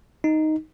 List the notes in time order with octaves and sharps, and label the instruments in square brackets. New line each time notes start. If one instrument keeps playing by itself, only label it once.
[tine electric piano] D#4